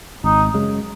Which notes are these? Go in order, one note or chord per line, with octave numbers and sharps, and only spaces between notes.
G#1 D#4
F#2 C#3 G#3